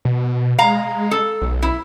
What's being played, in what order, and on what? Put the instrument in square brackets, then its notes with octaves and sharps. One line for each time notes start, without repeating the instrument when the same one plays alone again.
[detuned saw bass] B2
[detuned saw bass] G#3 [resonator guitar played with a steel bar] F5 A#5
[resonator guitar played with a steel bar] A4
[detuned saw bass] B1
[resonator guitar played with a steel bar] E4